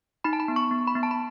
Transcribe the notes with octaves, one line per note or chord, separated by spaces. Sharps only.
D#4 B5
A5
B5
B3
C#6
B3
B5
B3
A5
B5